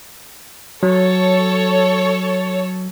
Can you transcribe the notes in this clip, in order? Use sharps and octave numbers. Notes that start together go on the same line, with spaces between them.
F#3 A4 C#5